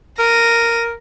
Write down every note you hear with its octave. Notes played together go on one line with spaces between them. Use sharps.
A#4 A#6 D#7